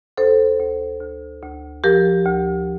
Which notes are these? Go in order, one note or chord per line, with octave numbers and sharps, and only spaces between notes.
D2 A4 C5
D2
D2
D2
F3 G4 A#4
D2